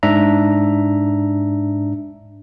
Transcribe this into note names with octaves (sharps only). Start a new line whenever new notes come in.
G#2 D4 E5 A#5